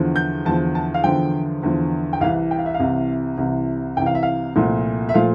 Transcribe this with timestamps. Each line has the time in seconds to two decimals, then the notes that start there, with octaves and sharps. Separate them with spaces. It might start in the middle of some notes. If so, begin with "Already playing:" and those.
Already playing: E2 D3 F3
0.16 G6
0.45 E2 D3 F3 A5
0.75 A5
0.94 F5
1.04 E2 D3 F3 G5
1.63 E2 D3 F3
2.13 G5
2.21 C2 C3 E3 F5
2.51 G5
2.58 F5
2.66 E5
2.74 F5
2.80 C2 C3 E3
3.38 C2 C3 E3
3.97 C2 C3 E3 G5
4.06 F5
4.15 E5
4.23 F5
4.56 C2 A#2 F3 A3
5.09 E5
5.14 A#2 F3 A3 F5